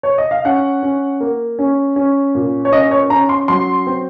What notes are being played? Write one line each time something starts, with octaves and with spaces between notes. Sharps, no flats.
C#5
D#5
F5
C#4 F#5
C#4
A#3
C#4
C#4
A#2
C#5
C#4 D#5
C#5
C#4 A#5
C6
F#3 C6
C4